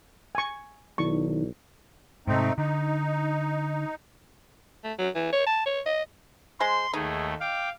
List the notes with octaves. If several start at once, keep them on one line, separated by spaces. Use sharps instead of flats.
G#5 C#6
B1 D#3 E4 D5 C#6
G#2 C3 A3 C4 D#4
D3 D#4
A3
F#3
E3
C#5
A5
C#5
D#5
G#3 C5 C6
D#2 A3 D#4 G#4
F5 G5 D6